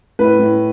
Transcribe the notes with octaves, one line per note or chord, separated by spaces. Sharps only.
A2 B4
A2